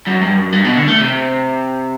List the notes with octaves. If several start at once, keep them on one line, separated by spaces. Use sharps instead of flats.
F#2
G2
F#2
G2
B2
D3
A3
C3